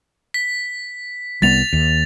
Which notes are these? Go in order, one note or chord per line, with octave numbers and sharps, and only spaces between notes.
B6
C2 G3 B3 A6 F7
D#2